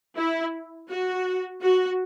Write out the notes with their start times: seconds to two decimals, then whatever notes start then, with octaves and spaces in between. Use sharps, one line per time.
0.16 E4
0.89 F#4
1.61 F#4